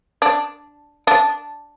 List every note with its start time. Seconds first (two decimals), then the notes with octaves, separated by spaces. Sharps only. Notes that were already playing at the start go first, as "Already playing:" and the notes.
0.22 D4
1.07 D4